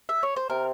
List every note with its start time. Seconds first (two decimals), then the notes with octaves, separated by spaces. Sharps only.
0.09 E5
0.23 C#5
0.36 C5
0.50 C3 A#4